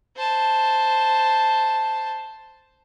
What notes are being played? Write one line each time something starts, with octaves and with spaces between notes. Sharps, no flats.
C5 A5